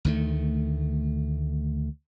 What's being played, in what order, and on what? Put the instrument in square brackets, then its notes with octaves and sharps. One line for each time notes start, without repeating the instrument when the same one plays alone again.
[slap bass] D2 D#3 A3